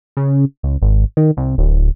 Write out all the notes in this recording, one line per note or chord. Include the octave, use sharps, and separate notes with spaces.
C#3
C#2
G#1
D#3
C2
D1